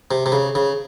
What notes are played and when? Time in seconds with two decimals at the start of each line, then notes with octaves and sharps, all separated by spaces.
0.11 C3
0.26 C3
0.32 C#3
0.55 C#3